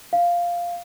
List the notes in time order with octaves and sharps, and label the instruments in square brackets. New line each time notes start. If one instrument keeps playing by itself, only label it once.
[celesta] F5